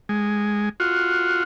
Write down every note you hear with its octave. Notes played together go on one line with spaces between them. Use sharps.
G#3
F4 F#4